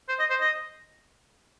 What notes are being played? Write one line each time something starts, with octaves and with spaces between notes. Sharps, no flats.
C5
D#5
C5
D#5